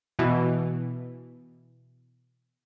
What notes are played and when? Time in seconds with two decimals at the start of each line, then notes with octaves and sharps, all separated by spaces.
0.19 B2 E3